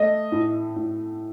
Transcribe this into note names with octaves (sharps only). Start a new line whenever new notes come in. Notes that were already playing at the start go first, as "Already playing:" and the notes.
Already playing: A3 D#5
A2
A2